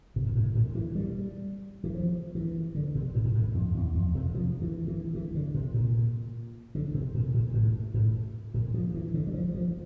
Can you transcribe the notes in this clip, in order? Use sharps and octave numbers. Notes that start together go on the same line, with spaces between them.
C3
A#2
A2
A#2
E3
G3
E3
F3
E3
D3
C3
A2
A#2
A2
F2
E2
F2
C3
F3
E3
E3
E3
D3
C3
A#2
D3
C3
A#2
A#2
A2
A2
A#2
F3
E3
D3
G3
F3
F3